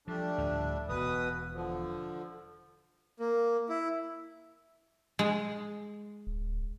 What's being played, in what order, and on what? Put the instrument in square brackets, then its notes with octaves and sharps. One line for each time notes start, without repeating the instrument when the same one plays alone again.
[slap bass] F3 [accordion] G3 A3 D4
[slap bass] D2 A2 F3
[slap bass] E1 [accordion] B2 B4 D#6
[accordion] D3 F3
[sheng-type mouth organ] A#3
E4
[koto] G#3
[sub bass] D1